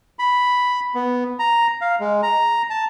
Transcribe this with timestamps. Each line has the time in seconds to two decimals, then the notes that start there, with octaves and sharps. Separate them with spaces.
0.19 B5
0.95 B3
1.39 A#5
1.81 F5
2.00 G#3
2.23 A#5
2.70 A5